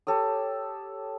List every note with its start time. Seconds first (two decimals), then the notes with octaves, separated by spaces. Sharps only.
0.07 G4 A4 C#5 D#6